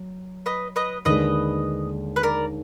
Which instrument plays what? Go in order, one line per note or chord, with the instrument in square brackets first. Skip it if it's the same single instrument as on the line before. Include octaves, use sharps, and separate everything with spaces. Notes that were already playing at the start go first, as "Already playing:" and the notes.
Already playing: [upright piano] F#3
[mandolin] B4 D#5
B4 D#5
[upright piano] D#2 D3 G#3 D4 [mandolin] B4 D#5
[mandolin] B4
A#4 D5